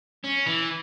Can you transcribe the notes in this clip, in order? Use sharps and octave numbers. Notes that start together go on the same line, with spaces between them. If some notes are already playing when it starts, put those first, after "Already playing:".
C#4
E3